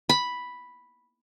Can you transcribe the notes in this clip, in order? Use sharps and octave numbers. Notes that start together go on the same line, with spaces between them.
B5